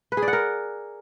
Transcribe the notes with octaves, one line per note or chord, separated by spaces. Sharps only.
B4
G#4
D5
F#5
A#4